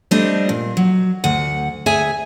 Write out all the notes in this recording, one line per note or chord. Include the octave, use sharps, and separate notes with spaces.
G3 A3 C4 D4 D#5
A#2
F#3
D2 F#5
D2 G#4 E5 G#5